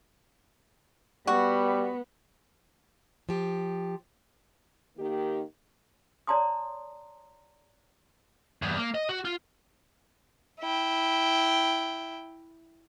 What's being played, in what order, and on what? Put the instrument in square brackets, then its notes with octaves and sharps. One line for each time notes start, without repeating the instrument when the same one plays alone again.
[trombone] G3 [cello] B3 [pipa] F#4
[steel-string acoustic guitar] F3 G4
[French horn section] D#3 A#3 G4
[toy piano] C#5 D5 A5 A#5 C6 D#6
[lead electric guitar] E2 G2
A#3
D#5
F#4
F4
[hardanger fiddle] E4 G5